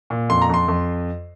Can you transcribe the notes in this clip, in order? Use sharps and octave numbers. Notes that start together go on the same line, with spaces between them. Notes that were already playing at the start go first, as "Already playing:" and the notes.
A#2
F2 C6
A#5
F2 C6
F2